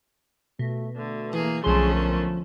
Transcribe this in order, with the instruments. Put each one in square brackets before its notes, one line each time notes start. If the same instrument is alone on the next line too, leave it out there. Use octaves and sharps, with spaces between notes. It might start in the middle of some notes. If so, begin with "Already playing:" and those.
[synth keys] B2 [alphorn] A3
[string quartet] D3 [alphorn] A3
[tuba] E3 [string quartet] A#3 G#4
[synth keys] B1 C6 [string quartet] D3 A3 C#4 [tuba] F3 [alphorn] G#4
[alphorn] A#4